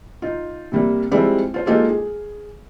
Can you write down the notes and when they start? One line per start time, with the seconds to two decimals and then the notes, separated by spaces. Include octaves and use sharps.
0.22 D#4 F4
0.72 C3 G3 A#3
1.11 F3 G3 G#3 C4 E4 G4
1.54 F4 C5
1.66 G#3 A#3 D#4 F4 G4 A4
1.89 G#4